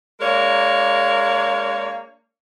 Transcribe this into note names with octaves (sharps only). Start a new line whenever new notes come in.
G#3 A#3 D4 A#4 C#5